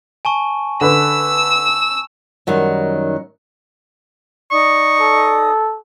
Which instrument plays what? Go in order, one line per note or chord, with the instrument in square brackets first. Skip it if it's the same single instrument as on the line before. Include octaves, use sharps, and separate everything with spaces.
[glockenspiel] G#5 A5 C#6
[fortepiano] D3 B4 [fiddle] E6
[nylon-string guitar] F#2 D#3 F#3 G3
[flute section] D#4 D5 D#6 [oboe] C#6
[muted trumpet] A4